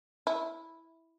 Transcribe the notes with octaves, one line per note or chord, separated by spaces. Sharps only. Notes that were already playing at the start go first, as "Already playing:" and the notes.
E4